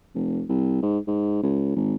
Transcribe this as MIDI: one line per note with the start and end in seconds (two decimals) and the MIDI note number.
0.14 0.43 29
0.49 0.79 36
0.82 0.99 44
1.07 1.39 44
1.43 1.76 37
1.76 1.96 32